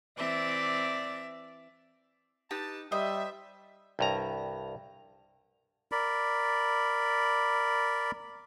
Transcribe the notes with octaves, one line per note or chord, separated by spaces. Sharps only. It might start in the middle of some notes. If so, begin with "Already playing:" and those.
E3 C4 D5 E5
D#4 G4 B4 A5
G3 C5 D#5 E5
C2 G2 A#5
A#4 D5 B5